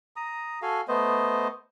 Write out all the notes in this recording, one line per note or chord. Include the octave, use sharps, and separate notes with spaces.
A#5 D#6
F#4 A4 F5 G#5
A3 B3 C5 D#5